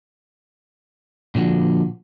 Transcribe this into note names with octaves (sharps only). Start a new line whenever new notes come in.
A#2 D3 F3 F#4